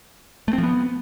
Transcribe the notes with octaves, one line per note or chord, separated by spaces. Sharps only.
A3
C4
F3
B3